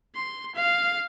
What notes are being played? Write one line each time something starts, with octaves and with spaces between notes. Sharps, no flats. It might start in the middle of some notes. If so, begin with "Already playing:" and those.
C6
F5